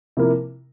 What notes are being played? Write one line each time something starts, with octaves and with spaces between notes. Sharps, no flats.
C3 F3 A#3 E4 A#4